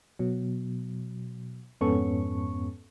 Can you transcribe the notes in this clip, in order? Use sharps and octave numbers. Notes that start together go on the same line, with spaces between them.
B2 F#3
F2 G#2 B3 C#4 A4 C#6